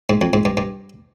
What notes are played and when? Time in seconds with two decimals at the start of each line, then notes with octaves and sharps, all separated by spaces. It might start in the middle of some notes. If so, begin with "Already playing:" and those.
0.10 G#2
0.21 F2
0.33 G#2
0.45 G2
0.57 G2